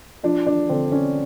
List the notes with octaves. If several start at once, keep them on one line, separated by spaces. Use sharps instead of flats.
F3 D4
D4
D3 C4
C#4